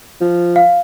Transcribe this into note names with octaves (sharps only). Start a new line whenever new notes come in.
F3
F5